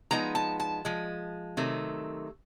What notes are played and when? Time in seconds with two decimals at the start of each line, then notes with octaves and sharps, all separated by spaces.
0.11 F3 G#3 B3 D#4 A#5
0.35 A5
0.60 A5
0.85 F3 G#3
1.57 C3 D#3 F#3 A3